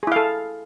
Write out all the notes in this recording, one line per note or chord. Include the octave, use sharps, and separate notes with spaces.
E4 G#4 A4 F5